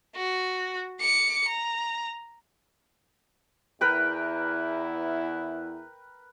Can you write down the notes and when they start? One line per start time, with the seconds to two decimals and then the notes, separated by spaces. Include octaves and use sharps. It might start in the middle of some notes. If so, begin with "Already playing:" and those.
0.15 F#4
1.00 D6 C#7
1.48 A#5
3.81 E2 E4 A#4 B4 G5